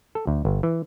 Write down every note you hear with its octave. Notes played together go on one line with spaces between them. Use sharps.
A4
D2
G1
E3